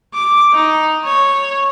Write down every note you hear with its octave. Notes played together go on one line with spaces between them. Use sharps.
D6
D#4
C#5